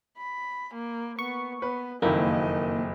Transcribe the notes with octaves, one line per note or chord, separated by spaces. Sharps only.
B5
A#3
B3 C#6
B3 B4
F#1 F2 D#3 A#3 C4 E4 D#5